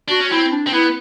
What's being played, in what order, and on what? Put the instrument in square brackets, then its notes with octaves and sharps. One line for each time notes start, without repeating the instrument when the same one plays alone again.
[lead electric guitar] D4 [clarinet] F#4
[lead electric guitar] C#4
[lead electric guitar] C4 [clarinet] E4
[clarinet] D4
[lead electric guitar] C4
[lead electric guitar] B3 [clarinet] E4